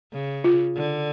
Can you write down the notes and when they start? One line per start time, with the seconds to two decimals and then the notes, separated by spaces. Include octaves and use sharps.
0.13 C#3
0.44 F4
0.76 D3